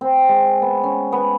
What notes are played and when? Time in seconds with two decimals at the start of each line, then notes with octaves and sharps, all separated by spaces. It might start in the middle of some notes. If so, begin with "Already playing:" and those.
0.01 C4
0.29 G#3
0.62 B3
0.83 C#4
1.12 B3